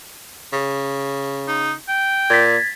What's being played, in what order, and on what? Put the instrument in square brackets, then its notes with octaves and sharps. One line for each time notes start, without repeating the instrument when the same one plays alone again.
[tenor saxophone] C#3
[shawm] D#4
G5
[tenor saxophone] A#2 [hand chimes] G#6 A6 B6